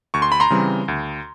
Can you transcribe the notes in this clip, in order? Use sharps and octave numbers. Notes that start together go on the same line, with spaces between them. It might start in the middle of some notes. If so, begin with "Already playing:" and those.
D2 C#6
C6
B5
A#5 C6
C#3 E3 G3 C4
D2